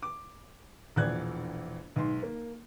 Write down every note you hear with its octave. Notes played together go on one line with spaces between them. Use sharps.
D6
E1 A#1 D5 F#6 G#6
B1 G#2 C6
A#3